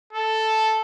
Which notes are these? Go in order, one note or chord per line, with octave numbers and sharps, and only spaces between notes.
A4